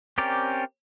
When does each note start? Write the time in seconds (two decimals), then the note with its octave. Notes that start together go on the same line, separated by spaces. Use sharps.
0.18 C4 C#4 G4 A#4 D5